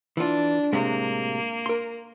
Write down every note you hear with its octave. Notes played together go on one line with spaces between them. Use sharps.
E3 D4 F4
A2 C3 G#3 A#3
A#4 C6